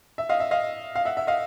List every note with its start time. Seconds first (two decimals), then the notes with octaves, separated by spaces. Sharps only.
0.18 E5
0.29 D#5 F5
0.40 E5
0.51 D#5 F5
0.95 F5
1.05 E5 F#5
1.17 E5
1.27 D#5 F5